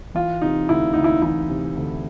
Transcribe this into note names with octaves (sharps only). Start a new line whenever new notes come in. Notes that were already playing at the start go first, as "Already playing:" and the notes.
E3 F4
C3 D#4
D2 E4
D2 D#4
E4
E3 E4
C3
D2